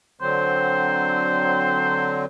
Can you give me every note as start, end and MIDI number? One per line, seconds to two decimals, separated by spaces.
0.21 2.26 50
0.21 2.26 54
0.21 2.26 60
0.21 2.26 72